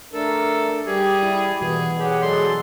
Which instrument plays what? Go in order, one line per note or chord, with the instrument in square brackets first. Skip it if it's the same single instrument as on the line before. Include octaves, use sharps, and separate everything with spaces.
[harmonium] A3 D4 A#4 [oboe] A4
[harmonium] G3 G4 D5 [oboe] G#4
[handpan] E4
[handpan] B2 E3 F#4 [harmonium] B3 [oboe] G#4
[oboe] G4 [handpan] G#4 F#5 [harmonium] C#5
[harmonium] F#3 G#3 [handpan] G#4 A4 D5 [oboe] C6